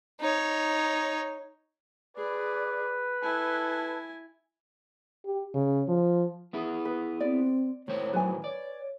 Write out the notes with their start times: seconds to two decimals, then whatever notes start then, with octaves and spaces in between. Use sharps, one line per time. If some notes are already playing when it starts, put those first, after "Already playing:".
0.20 D#4 C#5
2.17 G#4 B4 D5
3.23 E4 A4 G#5
5.25 G4
5.54 C#3
5.88 F3
6.53 B3 E4 G#4
6.85 B4
7.21 C4 D5
7.88 A2 D#3 C5 C#5
8.13 F#3 B4 G#5
8.44 C#5 D5